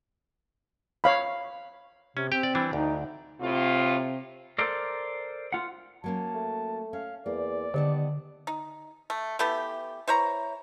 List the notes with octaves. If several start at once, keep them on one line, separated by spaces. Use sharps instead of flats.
C#5 F5 B5
C3 C#4
C4 G4 G5
D5
E3 G3 D4
D2 D#4
A2 C3 F4
A4 A#4 C5 D5
F4 F#5
F#3 A#3 C#4 A5
A3
C#4 F5
E2 A#3 D5
D3 D#3 G3 B3 A5
D#4
A3
E3 A3 B3 G4
E3 C5 C#5 A#5